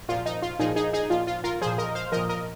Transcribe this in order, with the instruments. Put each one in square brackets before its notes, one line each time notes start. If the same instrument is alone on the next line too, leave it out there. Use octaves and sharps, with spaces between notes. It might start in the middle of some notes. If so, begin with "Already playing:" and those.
[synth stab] A#2 F3 F4
D#4
F4
A#2 F3 D#4 G#4
D#4 G#4
D#4 G#4
A#2 F3 F4
F4
F4 A#4
A#2 F3 G#4 C5
A#4 D#5
C5 F5
A#2 F3 A#4 D#5
A#4 D#5